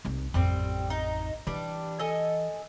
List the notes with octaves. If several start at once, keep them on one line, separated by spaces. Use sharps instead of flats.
C2 D#4
A1 F2 G3 C4
D#4
E3 G3 D4
A4 D#5 G#5